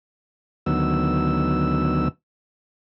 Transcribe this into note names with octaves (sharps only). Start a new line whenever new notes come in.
D2 D#3 F#3 B3 E6